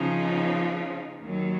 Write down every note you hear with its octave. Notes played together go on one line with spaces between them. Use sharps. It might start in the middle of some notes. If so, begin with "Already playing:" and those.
Already playing: C#3 F3 B3 D#4
D#2 D#3 F#3